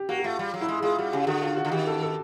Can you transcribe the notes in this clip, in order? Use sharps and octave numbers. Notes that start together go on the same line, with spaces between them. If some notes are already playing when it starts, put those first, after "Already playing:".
Already playing: G4
A#3 F#4
F#4
A3 F4
G3 F4
F#3
E4
G#3
G#3 F4
G3 F#4
C#3 G4
D3 F#4
F4
F#4
D3
D#3 G4
A4
A4